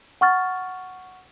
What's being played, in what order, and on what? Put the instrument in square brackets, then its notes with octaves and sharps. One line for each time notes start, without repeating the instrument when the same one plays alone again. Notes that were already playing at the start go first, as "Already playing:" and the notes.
[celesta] F#5 C#6 F6 A6